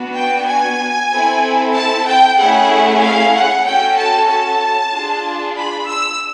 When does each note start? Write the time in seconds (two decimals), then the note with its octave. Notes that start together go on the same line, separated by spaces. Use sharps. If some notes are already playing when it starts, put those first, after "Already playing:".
Already playing: B3 D4 F#4
0.16 G5
0.48 G#5
1.11 C4 E4 A4
1.74 A5
2.06 G5
2.38 A3 C#4 E4 G#4 F#5
3.01 F5
3.33 F#5
3.65 C#4 F#4 A4 G5
3.97 A5
4.28 A5
4.92 D4 F4 G#4
5.55 B5
5.87 E6